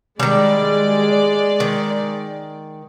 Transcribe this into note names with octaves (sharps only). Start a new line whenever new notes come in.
D#3 G3 G#3 D5
D#3